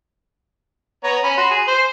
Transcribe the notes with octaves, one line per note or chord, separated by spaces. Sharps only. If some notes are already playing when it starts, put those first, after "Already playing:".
B3 C#5 A#5
C#4 B5
F#4 C6
G#4
C5